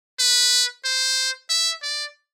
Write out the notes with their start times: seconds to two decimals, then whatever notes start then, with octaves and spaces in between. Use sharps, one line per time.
0.19 B4
0.84 C5
1.49 E5
1.82 D5